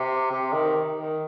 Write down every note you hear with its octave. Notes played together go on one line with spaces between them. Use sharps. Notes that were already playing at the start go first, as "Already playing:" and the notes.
Already playing: C3
C3
D#3
D#3